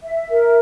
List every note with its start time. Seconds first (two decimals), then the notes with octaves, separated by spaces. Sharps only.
0.03 E5
0.30 A#4